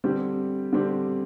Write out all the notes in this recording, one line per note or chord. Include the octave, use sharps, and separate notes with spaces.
D3 G3 C4 G4
D3 G3 C4 G4